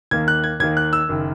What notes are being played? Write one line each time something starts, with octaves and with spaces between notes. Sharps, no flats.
D#2 D#3 A#3 G#6
F#6
G#6
D#2 D#3 A#3 G#6
F#6
E6
F#1 D#3